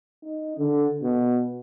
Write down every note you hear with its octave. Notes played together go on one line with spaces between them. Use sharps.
D#4
D3
B2